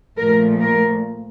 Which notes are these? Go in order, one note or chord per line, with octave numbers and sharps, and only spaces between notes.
A#2 F3 A3 A#4
A#4